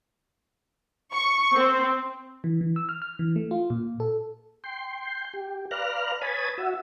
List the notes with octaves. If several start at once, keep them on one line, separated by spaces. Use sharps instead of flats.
C#6
C4
E3
E3
E6
F6
F6
E3
A3
F4
A#2
A4
G5 C6
G4
B4 D5 F5 A#5 F6 F#6
B4 C#5 G#5 A5 B5 D#6
F#4 E5